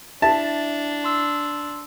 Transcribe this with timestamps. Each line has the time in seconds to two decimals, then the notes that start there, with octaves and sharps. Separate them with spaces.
0.22 D4 E4 E5 A5
1.04 C6 E6